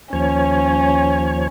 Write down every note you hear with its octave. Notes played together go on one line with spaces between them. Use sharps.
D#2 F3 C#4 C#5